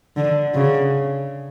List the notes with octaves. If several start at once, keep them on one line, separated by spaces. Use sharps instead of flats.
D3
C#3